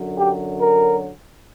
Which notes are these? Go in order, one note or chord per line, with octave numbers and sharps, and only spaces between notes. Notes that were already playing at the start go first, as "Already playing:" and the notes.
Already playing: F#2 D3 F#3
G4
A#4